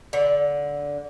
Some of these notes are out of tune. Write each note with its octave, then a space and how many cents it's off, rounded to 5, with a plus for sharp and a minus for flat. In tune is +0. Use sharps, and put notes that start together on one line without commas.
D3 -15